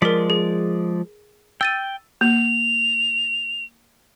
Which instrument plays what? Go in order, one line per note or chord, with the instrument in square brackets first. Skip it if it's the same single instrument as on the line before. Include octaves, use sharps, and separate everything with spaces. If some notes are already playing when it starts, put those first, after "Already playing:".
[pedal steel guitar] F3 G#3 D5 [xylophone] A#4 B6
[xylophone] G#4
[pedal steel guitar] G5 [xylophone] E6 A6 D#7
[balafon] A#3 [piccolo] F7